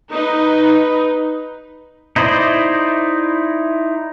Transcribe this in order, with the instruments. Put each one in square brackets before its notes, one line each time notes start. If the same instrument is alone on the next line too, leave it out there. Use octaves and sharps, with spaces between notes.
[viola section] D#4 B4
[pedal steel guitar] D#4 E4 C5 D5 D#5